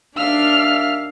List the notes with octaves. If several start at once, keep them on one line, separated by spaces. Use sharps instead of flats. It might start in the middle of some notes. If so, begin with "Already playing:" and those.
D#2 D4 E5 F5 F6